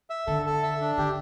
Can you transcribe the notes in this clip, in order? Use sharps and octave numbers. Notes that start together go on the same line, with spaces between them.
E5
D3 A4
A4
E5
D4
D3 G4